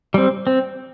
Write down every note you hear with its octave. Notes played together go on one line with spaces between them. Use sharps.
G3 C4
C4